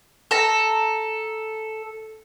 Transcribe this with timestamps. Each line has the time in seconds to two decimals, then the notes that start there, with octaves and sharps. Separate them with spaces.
0.31 A4 A#5